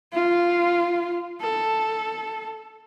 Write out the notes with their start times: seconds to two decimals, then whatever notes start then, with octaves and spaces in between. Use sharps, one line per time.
0.13 F4
1.42 A4